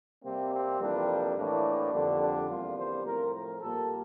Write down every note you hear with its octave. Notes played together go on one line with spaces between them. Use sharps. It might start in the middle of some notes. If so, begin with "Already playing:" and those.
C3 G3 A#3 C4
C4
F2 E3 G3 A#3 D4
A2 E3 A#3 D4
F2 D3 G3 A#3
D4
E2 C3 G3 A#3 F4
C5
A2 F3 C4 A#4
A#4
A#2 G3 A#3 A4